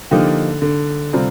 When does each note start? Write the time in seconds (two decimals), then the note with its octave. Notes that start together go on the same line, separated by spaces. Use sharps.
0.11 D3 F3 A#3 D#4 G4
0.62 D3
1.13 C3 G3 C4 F4